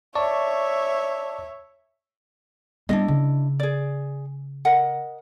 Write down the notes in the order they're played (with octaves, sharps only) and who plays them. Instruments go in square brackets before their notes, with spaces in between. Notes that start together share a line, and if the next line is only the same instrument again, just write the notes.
[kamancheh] C#5 E5 [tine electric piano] D5 A5 C#6
[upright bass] G3 B3 [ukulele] D4 E4 D#5
[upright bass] C#3
[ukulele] G#4 D5
A#4 D#5 F#5